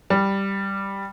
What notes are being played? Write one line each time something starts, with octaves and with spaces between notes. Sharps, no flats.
G3